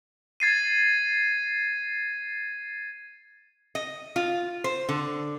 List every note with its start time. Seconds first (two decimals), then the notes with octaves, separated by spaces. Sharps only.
0.40 G#6 A6 C7 D#7
3.75 D#5
4.16 F4
4.64 C5
4.89 D3